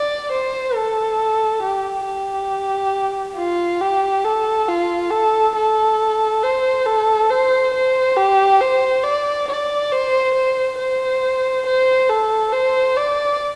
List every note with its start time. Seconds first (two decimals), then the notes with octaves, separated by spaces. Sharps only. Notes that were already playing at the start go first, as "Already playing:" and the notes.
Already playing: D5
0.31 C5
0.75 A4
1.62 G4
2.06 G4
3.37 F4
3.80 G4
4.25 A4
4.68 F4
5.11 A4
5.55 A4
6.43 C5
6.85 A4
7.30 C5
7.74 C5
8.16 G4
8.60 C5
9.03 D5
9.48 D5
9.92 C5
10.34 C5
10.78 C5
11.65 C5
12.09 A4
12.52 C5
12.97 D5